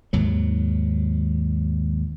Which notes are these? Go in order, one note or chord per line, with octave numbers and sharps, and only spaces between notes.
D#2 G#2 F#3